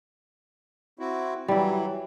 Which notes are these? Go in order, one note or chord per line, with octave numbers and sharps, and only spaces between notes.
C4 E4 F#4
E3 F#3 G3 E4